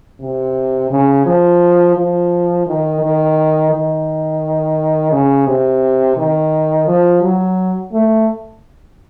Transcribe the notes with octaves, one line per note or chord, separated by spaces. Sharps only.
C3
C#3
F3
F3
D#3
D#3
D#3
C#3
C3
D#3
F3
F#3
A3